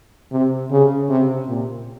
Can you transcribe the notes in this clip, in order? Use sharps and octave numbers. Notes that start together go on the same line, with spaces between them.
C3
C#3
C3
A#2